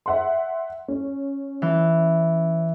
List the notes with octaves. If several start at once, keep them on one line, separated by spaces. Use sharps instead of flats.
E5 F#5 C6
C#4
E3